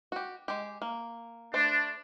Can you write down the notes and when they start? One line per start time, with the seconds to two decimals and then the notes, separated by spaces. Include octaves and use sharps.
0.12 F#4 G4
0.48 G#3 G4
0.82 A#3
1.54 A3 D4 C5